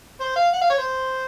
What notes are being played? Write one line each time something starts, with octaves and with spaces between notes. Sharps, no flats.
C5
F5
F#5
F5
C#5
C5